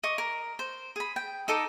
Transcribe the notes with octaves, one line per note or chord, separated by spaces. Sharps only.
D#5 C#6 D6
A#4
C5
G#4 B5
G5
D#4 A4 D#5 D6